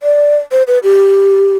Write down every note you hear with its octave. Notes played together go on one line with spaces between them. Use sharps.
D5
C5
B4
G4